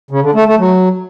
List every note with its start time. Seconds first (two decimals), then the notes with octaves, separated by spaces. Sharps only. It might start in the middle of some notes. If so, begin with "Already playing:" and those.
0.11 C#3
0.23 D3
0.35 A3
0.47 A3
0.59 F#3